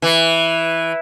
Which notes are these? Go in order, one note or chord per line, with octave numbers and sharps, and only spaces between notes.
E3